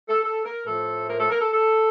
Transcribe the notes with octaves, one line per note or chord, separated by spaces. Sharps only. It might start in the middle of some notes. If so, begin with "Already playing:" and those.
A4
A4
A#4
A2 F3 A3 A4
A#4
A4
A#4
A4
A4